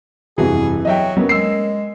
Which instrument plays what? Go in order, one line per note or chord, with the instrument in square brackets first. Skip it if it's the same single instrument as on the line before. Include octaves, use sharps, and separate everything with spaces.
[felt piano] F1 G2 F#4 [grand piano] E3 [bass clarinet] G#4
[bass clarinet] F#3 [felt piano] D#5 E5 G5
[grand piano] F#3 B3 [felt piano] A#3 C#4
[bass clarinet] G#3 [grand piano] E6 C7